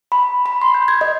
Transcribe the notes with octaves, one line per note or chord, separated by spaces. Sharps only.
B5
B5
C6
G6
G#6
D#5